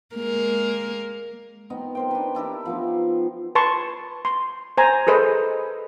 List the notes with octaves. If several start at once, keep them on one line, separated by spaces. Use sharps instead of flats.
G#3 A#3 A#4
B3 C4 D#4 D#5
A#4 C5 G5
D4 B4
D4 E4 G4 A#4
F3 B3 D#4
B4 A5 C6 C#6
C6
C5 G#5 A#5
G#4 A4 B4 C5 D#5